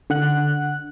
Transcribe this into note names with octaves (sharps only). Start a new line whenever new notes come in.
D3 F#5 F#6